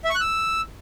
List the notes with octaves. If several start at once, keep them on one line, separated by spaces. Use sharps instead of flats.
E5
C#6
F#6
E6